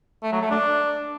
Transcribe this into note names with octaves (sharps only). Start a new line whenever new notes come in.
A3
F#3
A3
D4